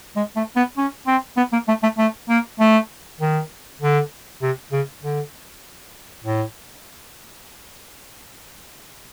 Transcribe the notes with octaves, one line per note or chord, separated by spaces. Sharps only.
G#3
A3
B3
C#4
C4
B3
A#3
A3
A3
A3
A#3
A3
D#3
D3
C3
C#3
D3
A2